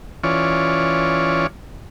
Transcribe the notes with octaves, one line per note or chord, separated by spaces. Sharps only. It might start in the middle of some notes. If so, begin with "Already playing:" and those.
E3 C#4 F4 C#5 D5